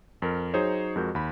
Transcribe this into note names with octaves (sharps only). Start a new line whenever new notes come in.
F2 A#4
F#3 D#4 G#4 C5 C#5
F2 G#3 F#4 A#4 G6
D#2 B5